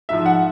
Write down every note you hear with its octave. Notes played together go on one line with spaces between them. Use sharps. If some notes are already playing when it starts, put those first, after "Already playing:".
G#2 F3 E5
F#5